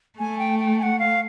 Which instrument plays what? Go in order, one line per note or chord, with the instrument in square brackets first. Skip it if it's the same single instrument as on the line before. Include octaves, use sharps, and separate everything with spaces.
[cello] A3 [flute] G#5
[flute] G5
G5
G#5
F#5
F5